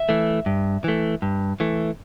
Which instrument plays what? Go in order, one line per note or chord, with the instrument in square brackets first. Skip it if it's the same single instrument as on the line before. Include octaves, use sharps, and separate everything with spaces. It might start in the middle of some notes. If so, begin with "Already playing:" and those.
Already playing: [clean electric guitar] E5
E3 A3
G2
E3 A3
G2
E3 A3